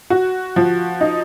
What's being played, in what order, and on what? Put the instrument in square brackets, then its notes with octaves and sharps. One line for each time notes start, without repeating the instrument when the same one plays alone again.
[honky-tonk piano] F#4
F3
D#4